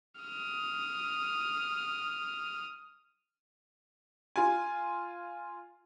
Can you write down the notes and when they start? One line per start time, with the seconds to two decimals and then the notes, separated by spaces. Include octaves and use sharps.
0.21 D#6 F6
4.36 F4 G#5